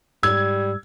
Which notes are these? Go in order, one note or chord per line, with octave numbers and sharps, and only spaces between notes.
G#2 G3 E6 G#6